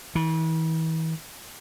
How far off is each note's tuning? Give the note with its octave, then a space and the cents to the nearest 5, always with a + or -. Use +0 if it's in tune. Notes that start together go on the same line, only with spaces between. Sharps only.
E3 -40